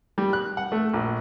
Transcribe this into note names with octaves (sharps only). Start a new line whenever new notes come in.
G3
F#6
F#5
A3
A#1